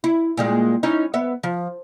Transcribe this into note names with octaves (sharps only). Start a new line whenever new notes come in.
E4
A#2 G3 G#3
C#4 D#4 E4
B3 E5
F3